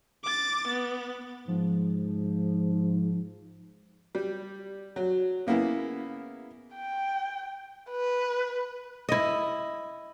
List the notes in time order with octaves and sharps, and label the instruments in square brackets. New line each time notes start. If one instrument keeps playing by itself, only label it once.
[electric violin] D6 A6
B3
[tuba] G#2 [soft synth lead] F3
[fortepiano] G3
F#3
C#3 A#3 B3 E4 G#4
[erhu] G5
B4
[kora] E4 D#5